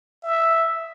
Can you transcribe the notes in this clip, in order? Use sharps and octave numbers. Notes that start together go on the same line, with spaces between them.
E5